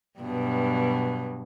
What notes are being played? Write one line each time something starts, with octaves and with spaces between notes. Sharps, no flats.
G2 B2 F#3